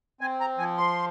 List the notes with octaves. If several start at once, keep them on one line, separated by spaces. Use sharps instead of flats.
C4 G#5
A#5
F3 G#5
C6